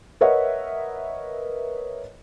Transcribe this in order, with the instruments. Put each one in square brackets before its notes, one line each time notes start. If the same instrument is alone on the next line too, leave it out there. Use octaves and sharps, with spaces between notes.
[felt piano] A#4 B4 C#5 D#5 E5 F#5